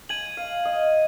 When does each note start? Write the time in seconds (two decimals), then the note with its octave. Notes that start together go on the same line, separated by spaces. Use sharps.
0.09 G#5 G#6 D#7 F#7
0.37 F5
0.65 D#5